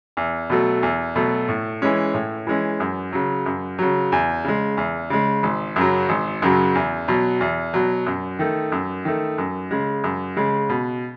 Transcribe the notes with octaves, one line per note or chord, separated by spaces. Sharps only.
E2
B2 F#3 A3
E2
B2 F#3 A3
A2
E3 G#3 C#4
A2
E3 G#3 C#4
F#2
C#3 F#3
F#2
C#3 F#3
E2
C#3 G#3
E2
C#3 G#3
G#1
F#2 C#3 F#3
G#1
F#2 C#3 F#3
E2
B2 F#3
E2
B2 F#3
F#2
D#3 A3
F#2
D#3 A3
F#2
C#3 G#3
F#2
C#3 G#3
B2